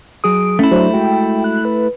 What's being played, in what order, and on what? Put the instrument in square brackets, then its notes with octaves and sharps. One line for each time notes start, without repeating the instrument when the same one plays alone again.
[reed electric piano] F#3 G#4 D#6 [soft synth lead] D7
[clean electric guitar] A3 E4 [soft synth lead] C#4
[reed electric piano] F#3 D4 F#4 [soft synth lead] C5
[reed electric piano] G#3 F#4 [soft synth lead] G5
[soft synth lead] F#6
B4